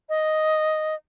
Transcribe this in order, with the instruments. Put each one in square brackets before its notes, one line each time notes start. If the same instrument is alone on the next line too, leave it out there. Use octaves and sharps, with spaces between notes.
[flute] D#5